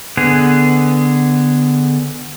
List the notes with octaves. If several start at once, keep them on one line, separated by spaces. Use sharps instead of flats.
D3 B3 G#4